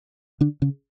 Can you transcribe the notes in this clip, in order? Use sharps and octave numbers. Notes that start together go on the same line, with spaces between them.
D3 D4
C#3 C#4